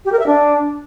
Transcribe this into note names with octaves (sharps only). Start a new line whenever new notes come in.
G4
A#4
E5
D4